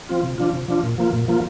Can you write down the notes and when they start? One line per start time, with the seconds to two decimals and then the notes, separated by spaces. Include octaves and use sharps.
0.09 F3 C4 F4
0.23 C3
0.38 F3 D4 F4
0.53 C3
0.68 F3 D4 F4
0.83 A#2
0.98 F3 A#3 F4
1.13 A#2
1.28 F3 A#3 F4